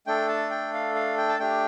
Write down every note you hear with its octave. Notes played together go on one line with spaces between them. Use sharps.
A3 D4 A4 G5
A5
G5
F5
F5
G5
A5
A3 D4 G4 G5